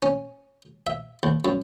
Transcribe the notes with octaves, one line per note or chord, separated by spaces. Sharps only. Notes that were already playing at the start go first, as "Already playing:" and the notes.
C#4
E5
D#2
F#2